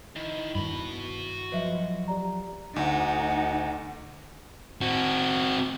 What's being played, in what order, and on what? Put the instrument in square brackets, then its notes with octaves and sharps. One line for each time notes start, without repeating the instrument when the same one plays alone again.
[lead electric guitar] D#3 [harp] E4
[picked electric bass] G2 D#3 [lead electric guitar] F#4 B5
[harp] F3 F#3 G#3 [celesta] B4 D#5 E5
[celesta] G4 D5 A#5
[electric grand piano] D2 [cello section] D#4 [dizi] F#5
[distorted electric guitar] C4 F#4